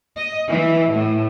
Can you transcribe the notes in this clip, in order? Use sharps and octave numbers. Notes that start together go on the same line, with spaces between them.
D#5
E3
A2